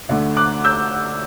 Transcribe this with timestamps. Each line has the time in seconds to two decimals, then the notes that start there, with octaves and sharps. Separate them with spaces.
0.09 D2 D3 A3
0.37 D6 F#6
0.64 E6 G6